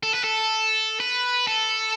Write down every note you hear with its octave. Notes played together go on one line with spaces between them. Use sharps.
A4
B4
A4
B4
A4